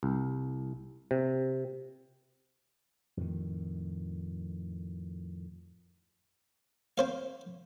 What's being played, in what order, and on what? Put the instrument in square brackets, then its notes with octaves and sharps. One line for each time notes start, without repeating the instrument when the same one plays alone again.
[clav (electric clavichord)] C2
C3
[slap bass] F2 A2 D#3
[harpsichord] C4 C5 F5